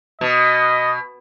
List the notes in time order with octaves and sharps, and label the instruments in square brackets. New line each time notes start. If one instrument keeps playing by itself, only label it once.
[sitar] B2 [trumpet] D#5